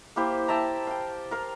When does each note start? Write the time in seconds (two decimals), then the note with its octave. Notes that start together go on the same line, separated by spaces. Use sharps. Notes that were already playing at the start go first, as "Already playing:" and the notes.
0.16 A#3 E4 G4 C5
0.48 E5 G5 A5 A#5
0.87 F5 G5
1.31 A#4 F5